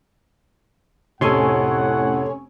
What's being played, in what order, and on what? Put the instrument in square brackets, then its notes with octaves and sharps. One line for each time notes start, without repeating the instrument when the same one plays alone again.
[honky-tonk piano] F1 [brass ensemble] A2 F#5 [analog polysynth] C#4 C#5 G#5 [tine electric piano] A4 C6